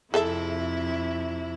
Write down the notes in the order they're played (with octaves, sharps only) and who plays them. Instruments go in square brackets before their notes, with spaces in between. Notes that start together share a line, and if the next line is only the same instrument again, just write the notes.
[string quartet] F2 C3 E4 [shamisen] G#4 A4 E5